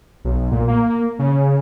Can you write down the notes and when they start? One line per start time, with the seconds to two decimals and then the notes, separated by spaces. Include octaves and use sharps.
0.25 B1
0.52 A#2
0.68 A#3
1.19 C#3